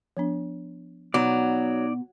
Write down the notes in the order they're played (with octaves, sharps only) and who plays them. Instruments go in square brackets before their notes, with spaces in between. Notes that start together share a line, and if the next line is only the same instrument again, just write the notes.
[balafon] F3 B3 D4
[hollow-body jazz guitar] B2 [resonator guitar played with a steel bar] F#3 [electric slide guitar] D#4 D5